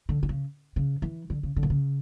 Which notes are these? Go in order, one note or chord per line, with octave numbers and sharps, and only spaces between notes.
D3
D3
C#3
C#3
E3
D3
C#3
D3
A#2
C#3